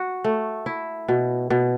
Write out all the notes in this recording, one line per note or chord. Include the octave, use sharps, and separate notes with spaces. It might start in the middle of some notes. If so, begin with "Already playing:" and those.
Already playing: F#4
A3
E4
B2
B2